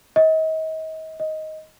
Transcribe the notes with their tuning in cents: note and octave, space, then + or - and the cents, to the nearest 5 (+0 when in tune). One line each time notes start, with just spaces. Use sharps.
D#5 +35
D#5 +10